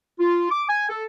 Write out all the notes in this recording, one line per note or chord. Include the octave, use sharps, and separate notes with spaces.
F4
D6
G#5
A4